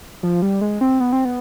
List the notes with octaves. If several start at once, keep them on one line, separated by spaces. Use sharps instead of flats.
F3
G3
G#3
C4
B3
C4
B3